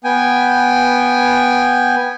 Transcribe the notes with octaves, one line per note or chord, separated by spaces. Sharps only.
B3 G5 G#5